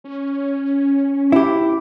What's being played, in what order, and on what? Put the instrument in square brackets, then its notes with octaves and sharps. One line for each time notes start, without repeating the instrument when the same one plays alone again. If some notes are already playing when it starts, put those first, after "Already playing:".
[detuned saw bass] C#4
[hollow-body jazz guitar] E4 G4